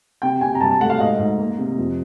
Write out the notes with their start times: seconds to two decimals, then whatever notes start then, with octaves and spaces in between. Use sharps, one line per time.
0.22 C3 G5
0.41 C3 G#5
0.55 A#5
0.61 G2 A5
0.71 A5
0.81 A3 F#5
0.90 F5
1.00 G#2 D#5
1.19 G#2
1.38 A#3
1.58 C3
1.78 F2